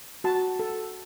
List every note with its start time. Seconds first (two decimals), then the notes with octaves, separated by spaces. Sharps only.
0.24 F#4 A5
0.60 A4